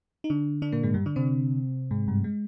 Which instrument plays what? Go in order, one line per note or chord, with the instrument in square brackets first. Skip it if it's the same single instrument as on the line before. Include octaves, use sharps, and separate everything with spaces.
[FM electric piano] D#4
D3 D4
D3 D4
A#2 A#3
G#2 G#3
G2 G3
D3 D4
C3 C4
G#2 G#3
G2 G3
G#3